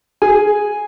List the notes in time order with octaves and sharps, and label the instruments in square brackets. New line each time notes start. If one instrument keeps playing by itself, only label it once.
[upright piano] G#4 [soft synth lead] G#5